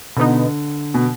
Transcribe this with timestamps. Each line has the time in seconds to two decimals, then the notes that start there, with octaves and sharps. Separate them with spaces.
0.17 B2 D3 B3 D#4
0.94 B2